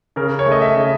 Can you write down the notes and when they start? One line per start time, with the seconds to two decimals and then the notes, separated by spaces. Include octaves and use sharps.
0.16 C#3 A#4
0.39 C#5
0.46 A3
0.52 D#5
0.61 E5
0.76 C#3